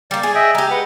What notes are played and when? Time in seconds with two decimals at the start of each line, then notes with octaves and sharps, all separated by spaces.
0.11 G3 A#3 D5
0.23 G#4
0.35 D#5 E5 G5
0.55 G#3 G4 A#5
0.70 B4 F#5